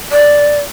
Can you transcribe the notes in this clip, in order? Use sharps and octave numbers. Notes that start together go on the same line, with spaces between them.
D5